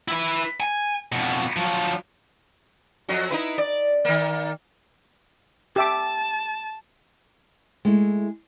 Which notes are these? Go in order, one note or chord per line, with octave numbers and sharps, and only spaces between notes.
E4 B4
G#5
F2 B2
F3 F#3
F2 F#3 F#4
D#4 E4 B4
D5
D#3 A#3
G4 E5 A5 D6
G#3 A3 E4